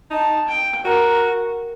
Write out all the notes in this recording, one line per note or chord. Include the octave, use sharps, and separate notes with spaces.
D#4 A5
G5
F#4 A#4